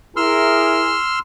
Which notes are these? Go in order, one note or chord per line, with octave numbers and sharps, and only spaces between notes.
E4 G#4 A#4 C6 E6 F6